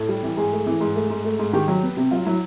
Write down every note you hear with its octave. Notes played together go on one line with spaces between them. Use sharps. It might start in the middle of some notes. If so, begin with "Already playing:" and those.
Already playing: A2
G3
E3
G#2 G#4
A3
E3
G#2
A3
G#2
A3
G#2
D#3 G4
F#3
B3
C3
F#3 F4
F#3 E4